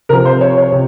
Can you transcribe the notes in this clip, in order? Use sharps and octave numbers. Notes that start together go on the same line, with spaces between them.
C3 F3 A#4
C5
C#5
C#5
C3